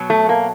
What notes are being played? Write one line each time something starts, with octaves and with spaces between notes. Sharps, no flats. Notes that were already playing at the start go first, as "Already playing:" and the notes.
Already playing: B2 F#3
A3
A#3